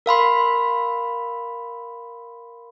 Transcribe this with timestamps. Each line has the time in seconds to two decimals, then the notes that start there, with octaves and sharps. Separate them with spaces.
0.06 A#4 F5 B5 C6